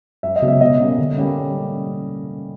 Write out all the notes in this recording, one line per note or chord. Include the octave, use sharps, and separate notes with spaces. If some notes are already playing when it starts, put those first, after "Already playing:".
F#2 E5
D#5
C#3 F#3 B3
E5
B2 D#5
G3 A#3 C#4
D3
G3 A#3 C#4